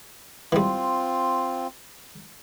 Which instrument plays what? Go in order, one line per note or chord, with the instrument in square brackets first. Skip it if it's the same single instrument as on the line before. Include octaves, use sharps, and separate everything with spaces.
[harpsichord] E3 G3 [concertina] C4 F4